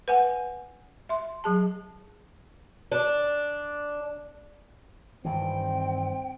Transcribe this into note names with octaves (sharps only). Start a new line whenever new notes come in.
B4 F#5 G#5
E5 C6
F#3 G#4 A5
D4
G2 D#3 E3 C4 G5